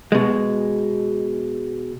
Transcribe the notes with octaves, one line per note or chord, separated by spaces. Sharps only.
B2 G#3